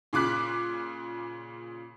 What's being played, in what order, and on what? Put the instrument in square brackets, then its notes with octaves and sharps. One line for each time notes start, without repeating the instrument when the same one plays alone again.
[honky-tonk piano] A#2 C#3 D6 F#6 B6